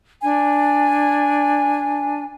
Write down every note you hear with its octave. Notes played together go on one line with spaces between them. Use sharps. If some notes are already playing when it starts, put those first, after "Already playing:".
D4 G#5